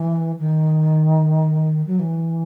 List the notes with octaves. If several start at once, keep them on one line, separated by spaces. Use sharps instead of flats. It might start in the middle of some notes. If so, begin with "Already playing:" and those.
Already playing: E3
D#3
F#3
E3